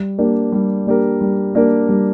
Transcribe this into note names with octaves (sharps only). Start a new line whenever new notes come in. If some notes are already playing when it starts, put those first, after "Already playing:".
Already playing: G3
A#3 D4 G4 A#4
G3
A#3 D4 G4 A#4
G3
A#3 D4 G4 A#4
G3